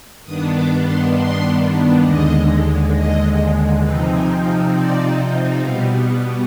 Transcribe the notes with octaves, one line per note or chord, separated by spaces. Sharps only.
G2 D#3 B3 D4 D#6
D6
C6
C6
D#2 D3 G#3 D#5
D#5
C3 F3 C4 D#4 B4
G#5
F5
D5
B2 G3 B3 F5